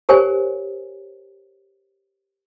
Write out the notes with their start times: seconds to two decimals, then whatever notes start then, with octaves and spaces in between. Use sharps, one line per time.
0.09 G4 A#4 C5 C#5 G#5